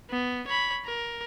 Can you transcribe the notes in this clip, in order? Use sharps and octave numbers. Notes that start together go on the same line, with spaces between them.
B3
C#5 B5
A#4